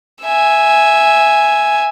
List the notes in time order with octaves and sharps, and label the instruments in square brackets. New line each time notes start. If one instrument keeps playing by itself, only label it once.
[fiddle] E5 G#5